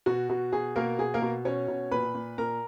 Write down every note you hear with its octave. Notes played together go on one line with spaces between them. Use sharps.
B2 F#4
B2
B2 G#4
B2 A#3 A#4
B2 G#4
A#3 A#4
B2
B2 C#4 C#5
B2
A#2 B4 B5
A#2
A#2 A#4 A#5